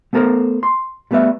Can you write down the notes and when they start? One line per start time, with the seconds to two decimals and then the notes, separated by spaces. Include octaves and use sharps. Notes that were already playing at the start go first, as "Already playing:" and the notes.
0.13 A3 B3 A4 A#4 C5
0.63 C6
1.11 G3 A3 B3 B4 E5